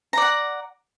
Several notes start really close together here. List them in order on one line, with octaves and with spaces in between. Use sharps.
A#5 D5 F#5